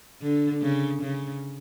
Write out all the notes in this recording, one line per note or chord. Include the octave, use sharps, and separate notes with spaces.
D3
C#3
C#3